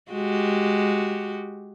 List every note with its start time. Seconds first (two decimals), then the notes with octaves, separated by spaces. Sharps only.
0.11 G#3 F#4 G4